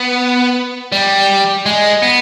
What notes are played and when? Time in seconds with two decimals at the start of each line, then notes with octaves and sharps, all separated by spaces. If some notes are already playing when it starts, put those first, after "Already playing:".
Already playing: B3
0.92 G3
1.66 G#3
2.02 B3